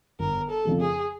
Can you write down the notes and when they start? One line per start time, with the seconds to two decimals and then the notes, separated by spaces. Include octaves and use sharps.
0.19 G1 A#4
0.50 A4
0.65 F2 C#3 F3 A3
0.80 G#4